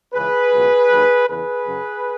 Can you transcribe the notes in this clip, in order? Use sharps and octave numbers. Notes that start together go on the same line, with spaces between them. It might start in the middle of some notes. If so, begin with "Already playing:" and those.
C#2 C#3 E3 G#4 B4
C#2 B2 F#3
D#2 D#3 F#3
E2 C#3 E3 G#4 B4
F#2 C#3 F#3